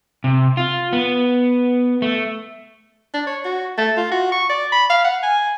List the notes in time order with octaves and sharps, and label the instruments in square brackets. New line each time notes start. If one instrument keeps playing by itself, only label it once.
[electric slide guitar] C3
F4
B3
A3
[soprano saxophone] D4
C#5
F#4
A3
F4
F#4
C#6
D5
B5
F5
F#5
G#5